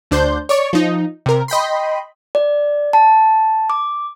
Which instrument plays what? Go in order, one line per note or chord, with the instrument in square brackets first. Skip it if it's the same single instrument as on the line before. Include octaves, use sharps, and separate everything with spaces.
[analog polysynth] D2 D4 C5 G6
C#5 D5 C#6
F3 D#4
C3 A#4
D#5 G5 B5 C6
[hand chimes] D5
A5
D6